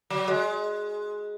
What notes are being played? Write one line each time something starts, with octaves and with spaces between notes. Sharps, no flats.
F#3
G#3